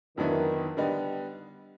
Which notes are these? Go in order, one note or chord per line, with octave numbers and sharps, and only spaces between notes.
F2 D3 D#3 F#3 B3 E4
D3 G3 B3 D#4